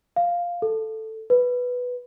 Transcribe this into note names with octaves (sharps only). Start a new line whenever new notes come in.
F5
A4
B4